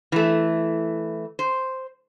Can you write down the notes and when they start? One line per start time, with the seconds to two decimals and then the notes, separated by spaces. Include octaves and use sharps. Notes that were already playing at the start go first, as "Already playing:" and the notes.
0.12 E3 A3
1.39 C5